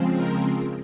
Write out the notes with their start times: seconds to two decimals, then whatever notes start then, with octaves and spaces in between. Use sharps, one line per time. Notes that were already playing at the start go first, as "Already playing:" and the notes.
Already playing: C#3 F3 G#3 C4
0.14 A#4